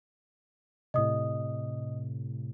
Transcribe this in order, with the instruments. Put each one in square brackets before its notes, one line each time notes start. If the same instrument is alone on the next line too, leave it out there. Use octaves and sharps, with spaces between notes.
[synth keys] A2 C3 [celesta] D#5 D#6